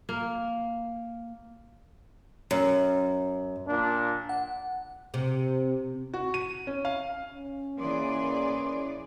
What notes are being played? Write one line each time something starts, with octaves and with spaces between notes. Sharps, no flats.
A#3
F#2
A#2 A#3 D4
F#5
C3
F#4
D#7
C#4
F5
C#4
E3 A#3 G#4 D5 C6